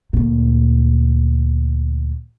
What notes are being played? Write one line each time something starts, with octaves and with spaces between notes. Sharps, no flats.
D2 A#2